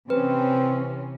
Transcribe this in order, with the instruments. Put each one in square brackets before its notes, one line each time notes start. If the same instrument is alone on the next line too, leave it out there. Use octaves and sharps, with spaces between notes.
[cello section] C3 E3 C#4 [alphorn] C4 [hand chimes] B4